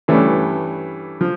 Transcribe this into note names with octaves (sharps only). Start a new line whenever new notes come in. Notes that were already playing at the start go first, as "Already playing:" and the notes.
G2 E3 A3 C#4
F3